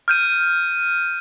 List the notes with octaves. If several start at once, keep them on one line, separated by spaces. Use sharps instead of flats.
F6 G6 D#7